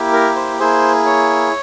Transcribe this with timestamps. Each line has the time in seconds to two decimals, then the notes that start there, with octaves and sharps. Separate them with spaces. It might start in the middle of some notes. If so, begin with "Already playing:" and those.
Already playing: A#3 E4 G4
0.13 A#4
0.36 C5
0.59 A#3 E4 G#4 C5
1.06 C#5